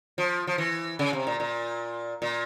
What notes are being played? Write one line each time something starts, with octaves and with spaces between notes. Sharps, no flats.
F3
F3
E3
C#3
C3
A#2
A#2
A#2